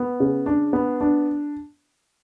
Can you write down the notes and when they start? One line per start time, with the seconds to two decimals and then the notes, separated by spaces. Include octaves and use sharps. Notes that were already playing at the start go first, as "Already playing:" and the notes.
Already playing: B3
0.20 C#3
0.46 D4
0.73 B3
1.01 D4